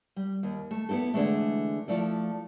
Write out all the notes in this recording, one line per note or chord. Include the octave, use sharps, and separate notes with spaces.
G3
D#2
A3
B3 E4 G4 A4
D3 E3 G#3 A3
F3 A3 E4 D5